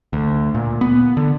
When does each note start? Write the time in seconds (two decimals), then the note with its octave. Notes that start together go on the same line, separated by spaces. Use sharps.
0.13 D2
0.55 A#2
0.81 B3
1.17 D3